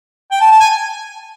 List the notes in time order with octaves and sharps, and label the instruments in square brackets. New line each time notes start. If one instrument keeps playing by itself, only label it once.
[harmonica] G5
A5
A5
G#5